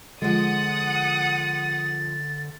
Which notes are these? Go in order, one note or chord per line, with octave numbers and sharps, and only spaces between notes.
D3 F3 G#3 F#5 D#6 A6